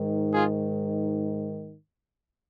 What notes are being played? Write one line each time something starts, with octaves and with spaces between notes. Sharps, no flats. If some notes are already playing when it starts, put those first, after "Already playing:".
Already playing: G#2 D#3
F4 G#4